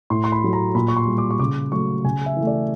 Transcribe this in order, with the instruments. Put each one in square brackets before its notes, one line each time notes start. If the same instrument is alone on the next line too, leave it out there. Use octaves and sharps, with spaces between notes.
[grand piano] A2 C6
C6
B5
F#3 A3
A#5
A#2 B5
C#6
C6
G3
D6
C#6
C#3 D6
F#3 A3 C#6
C#3 G#5
E5
E3 A3
D5